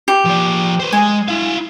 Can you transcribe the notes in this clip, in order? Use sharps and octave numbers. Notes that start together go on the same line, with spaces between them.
G4
F3 D5
B4 C5
G#3 G#5
E4 F5